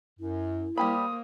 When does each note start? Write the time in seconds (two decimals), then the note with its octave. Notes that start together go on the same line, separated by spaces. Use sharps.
0.20 F#2 E4
0.78 G3 A#3 G4 C5 B5 D#6